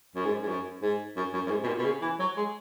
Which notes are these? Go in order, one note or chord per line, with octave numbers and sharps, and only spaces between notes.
F#2
G#2
G#2
F#2
G#2
F#2
F#2
F#2
G#2
B2
A#2
B2
C#3
E3
F#3
G#3